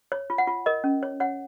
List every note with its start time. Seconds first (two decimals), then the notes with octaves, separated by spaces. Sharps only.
0.12 C#5
0.30 F4
0.38 F#5
0.47 F4
0.66 A#4 D#5
0.84 C#4
1.03 C#5
1.20 C#5 F#5